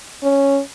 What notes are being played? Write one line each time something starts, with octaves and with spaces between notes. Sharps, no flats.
C#4